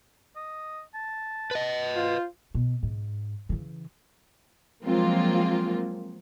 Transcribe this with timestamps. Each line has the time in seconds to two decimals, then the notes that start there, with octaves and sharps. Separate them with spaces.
0.36 D#5
0.94 A5
1.51 B4 D#5
1.96 F4 C5
2.55 B2
2.83 G#2
3.49 C#3 E3
4.84 F3 F#3 G#3 A#3 C4 F4